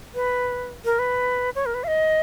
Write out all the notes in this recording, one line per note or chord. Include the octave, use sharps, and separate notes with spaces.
B4
A#4
B4
C#5
A#4
B4
F5
D#5